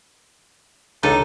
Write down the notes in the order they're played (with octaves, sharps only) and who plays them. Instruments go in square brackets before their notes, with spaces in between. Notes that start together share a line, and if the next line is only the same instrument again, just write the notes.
[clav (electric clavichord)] C#2 B4 [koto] D4 A4 [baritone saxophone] D#4